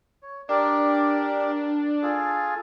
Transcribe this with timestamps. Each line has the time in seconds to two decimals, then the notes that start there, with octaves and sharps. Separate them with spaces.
0.23 C#5
0.49 D4 G4 A#4 D5
2.03 F4 G#4 A4